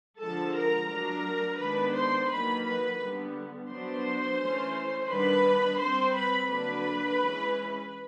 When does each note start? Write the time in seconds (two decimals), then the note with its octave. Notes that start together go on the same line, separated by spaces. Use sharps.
0.19 D3 F3 G#3 A4 A5
0.54 A#4 A#5
0.89 F#3 A3 D4 A#4 A#5
1.58 D#3 G#3 B3 D4 B4 B5
1.93 C5 C6
2.28 D#3 F#3 A#3 B4 B5
2.64 B4 B5
2.99 D3 G3 B3
3.69 F#3 B3 D4 C5 C6
4.38 E3 A3 C#4
5.08 D#3 G3 B3 D4 B4 B5
5.79 G3 C4 C5 C6
6.14 B4 B5
6.48 D3 F#3 A#3 D4 B4 B5
7.19 E3 G#3 C#4